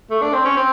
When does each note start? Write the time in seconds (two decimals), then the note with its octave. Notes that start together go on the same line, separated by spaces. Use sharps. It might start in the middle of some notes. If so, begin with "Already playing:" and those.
0.10 A3
0.22 D4
0.33 C4
0.45 C#4
0.57 C4